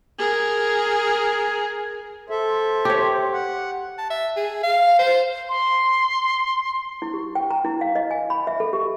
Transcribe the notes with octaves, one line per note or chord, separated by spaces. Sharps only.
G#4 A#4
A4 C5 E5
G4 C#5
F#5
A5
E5
G#4
F5
C5
C6
E4
G4
G5
A#5
E4
F5
D#5
G#5
B5
E5
A4
G4